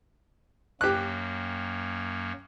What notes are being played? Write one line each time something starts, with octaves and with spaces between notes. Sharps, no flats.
F#2 F#3 A#3 G4 F#6